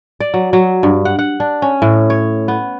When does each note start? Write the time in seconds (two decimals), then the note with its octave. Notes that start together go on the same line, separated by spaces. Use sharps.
0.20 D5
0.34 F#3
0.53 F#3
0.83 G2
1.05 F#5
1.19 F#5
1.40 D4
1.62 C#4
1.82 A2
2.10 C#5
2.48 B3